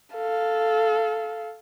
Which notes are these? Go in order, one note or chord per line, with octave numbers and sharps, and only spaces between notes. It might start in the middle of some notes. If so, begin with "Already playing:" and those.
A4 F5